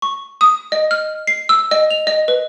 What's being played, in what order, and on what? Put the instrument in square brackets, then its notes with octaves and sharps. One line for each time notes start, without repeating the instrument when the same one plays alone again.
[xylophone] C#6
D#6
D#5
F6
C7
E6
D#5
F7
D#5
B4